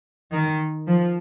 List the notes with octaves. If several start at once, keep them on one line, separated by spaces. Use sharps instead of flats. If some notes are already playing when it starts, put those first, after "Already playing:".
D#3
F3